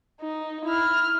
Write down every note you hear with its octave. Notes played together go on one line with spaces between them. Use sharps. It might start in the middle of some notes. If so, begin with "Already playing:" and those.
D#4
E4 F6